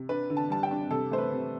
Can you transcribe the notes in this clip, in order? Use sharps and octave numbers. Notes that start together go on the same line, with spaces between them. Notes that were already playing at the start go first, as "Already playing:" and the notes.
Already playing: C3
D4 B4
D3
A5
G3 A5
G5
D4
C3 A4
A3 C5
B4
C3